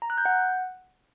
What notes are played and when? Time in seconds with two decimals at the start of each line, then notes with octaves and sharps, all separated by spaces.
0.02 A#5
0.10 F#6
0.18 G6
0.25 F#5